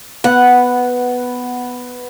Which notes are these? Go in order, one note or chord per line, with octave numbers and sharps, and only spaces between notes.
B3 F#5